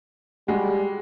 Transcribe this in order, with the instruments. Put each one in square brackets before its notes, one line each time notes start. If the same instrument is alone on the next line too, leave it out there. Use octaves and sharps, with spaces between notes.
[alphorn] G3 [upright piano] G#3 F#4